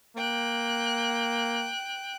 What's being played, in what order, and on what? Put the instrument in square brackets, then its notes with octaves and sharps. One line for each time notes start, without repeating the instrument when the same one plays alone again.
[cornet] A#3 [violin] G5 F#6